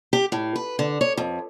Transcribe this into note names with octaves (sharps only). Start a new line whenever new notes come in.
G4
A2
B4
D3
C#5
F2